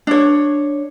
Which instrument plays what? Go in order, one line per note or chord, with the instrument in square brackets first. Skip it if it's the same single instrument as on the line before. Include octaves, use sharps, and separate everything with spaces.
[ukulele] D4 C#5